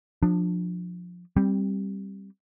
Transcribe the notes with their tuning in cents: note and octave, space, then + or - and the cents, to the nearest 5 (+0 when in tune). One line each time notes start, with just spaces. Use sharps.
F3 +20 D4 +20
G3 +0 C4 +20